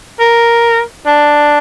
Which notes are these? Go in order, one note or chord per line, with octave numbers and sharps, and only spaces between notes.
A#4
D4